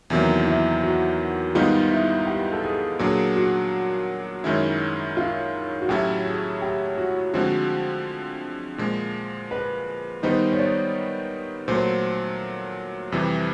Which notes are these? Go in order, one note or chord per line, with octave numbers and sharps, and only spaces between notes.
E2 C3 D#3 F#3 A#3 E4
E4
F#4
G#2 D#3 G3 B3 D#4 F4
E4
G4
A4
G#4
A#2 F#3 A#3 D4 G#4
F#4
F#2 D#3 G#3 C#4 E4
F4
F#4
A2 F#3 A3 C#4 E4 G4
G#4
G4
F#4
D3 F3 G#3 C4 F#4
A#2 F3 G#3
B4
D#3 G3 B3 D#4 C5
C#5
D5
A#2 F#3 A3 C5
F2 C3 E3 G3